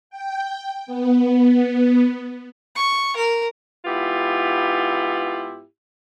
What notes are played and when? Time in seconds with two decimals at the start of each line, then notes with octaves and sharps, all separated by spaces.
0.10 G5
0.86 B3
2.76 C#6
3.16 A#4
3.85 G#2 B3 E4 F4 G4